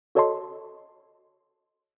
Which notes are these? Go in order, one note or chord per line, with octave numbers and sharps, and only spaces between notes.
F#4 A4 C#5 D#5 A5 C6